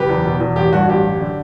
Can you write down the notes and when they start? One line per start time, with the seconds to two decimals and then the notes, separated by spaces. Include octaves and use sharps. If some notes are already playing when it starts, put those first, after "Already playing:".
Already playing: F#1 G4 B4
0.09 E2
0.24 B2
0.40 E2
0.56 A1 G4
0.72 G2 F#4
0.88 A1 G4
1.05 F#2
1.20 D3